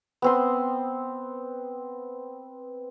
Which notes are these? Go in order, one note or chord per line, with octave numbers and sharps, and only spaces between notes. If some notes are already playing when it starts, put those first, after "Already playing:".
B3 C4 C6